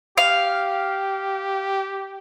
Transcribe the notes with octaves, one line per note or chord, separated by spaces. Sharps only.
G4 F5